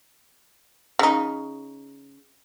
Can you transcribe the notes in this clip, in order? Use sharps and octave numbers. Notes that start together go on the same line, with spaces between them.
C#3 D#4